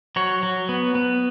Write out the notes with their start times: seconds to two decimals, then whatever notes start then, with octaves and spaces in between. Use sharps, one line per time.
0.16 F#3 C#5
0.43 F#3
0.69 B3
0.95 B3